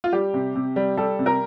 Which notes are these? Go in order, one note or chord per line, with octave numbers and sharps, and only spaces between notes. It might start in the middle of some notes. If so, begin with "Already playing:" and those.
F4
G3 G4
C3
C3
G3
G3 A4
C3
A#4